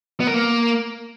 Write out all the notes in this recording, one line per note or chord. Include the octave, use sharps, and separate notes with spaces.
B3
A#4
A#3